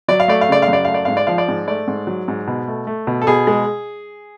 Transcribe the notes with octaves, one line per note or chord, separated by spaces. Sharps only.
F#3 D5
F5
A3 D5
F5
C#3 D5
F5
F#2 D5
A3 F5
D5
G#2 F5
D5
F3 F5
D5
G#2
A3 D5
G#2
F#3
G#2
B2
A3
A3
B2
A4
B2 G#4
G#3